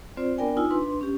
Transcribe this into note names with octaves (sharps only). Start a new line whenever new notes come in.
C4 F4 C5 D5
B3 D4 A#4 D5 G5 G#5
D#4 F4 G#5 E6
D4 B4 C6
C#4 G4